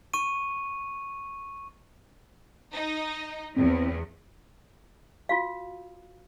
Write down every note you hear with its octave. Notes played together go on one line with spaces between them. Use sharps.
C#6 D#7
D#4
E2 C4
F4 F#4 F5